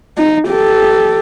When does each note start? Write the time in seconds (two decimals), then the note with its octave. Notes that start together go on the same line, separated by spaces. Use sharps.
0.18 D#4
0.48 G4 A4